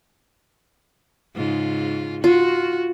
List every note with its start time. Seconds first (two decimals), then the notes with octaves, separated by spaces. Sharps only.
1.35 G#2 C#3 F4
2.24 F4 F#4